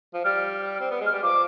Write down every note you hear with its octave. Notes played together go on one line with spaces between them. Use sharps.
F3
G3 F6
C4
B3
G#3
F6
G3
F3 D6